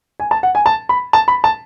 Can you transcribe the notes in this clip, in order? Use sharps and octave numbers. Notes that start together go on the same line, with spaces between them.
G#5
A5
F#5
G#5
A5
B5
A5
B5
A5